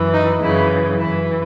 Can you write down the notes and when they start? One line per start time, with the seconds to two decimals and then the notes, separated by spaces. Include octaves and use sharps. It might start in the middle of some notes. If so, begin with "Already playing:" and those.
Already playing: F#2 E3
0.13 D#4
0.42 F#2 C#3 E3 E4
0.99 F#2 E3 E4